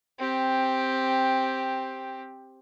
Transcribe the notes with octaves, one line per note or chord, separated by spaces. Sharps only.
C4 G4